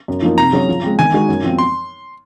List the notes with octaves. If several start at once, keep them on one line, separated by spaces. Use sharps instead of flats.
F#2
F3 A#3 D#4
C3 A#5
F#3 C#4 G#4
F3
G#3 C4
D#3 G#5
G#3 D#4 F#4
F#2
F3 C4
C6